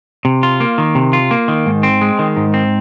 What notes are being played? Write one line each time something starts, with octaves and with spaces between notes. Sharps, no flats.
C3
F4
A#3
D#3
C3
F4
A#3
D#3
G#2
C4
G#3
D#3
G#2
C4